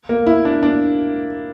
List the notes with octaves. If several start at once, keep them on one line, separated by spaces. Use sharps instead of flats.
A#3
E4
D4
D4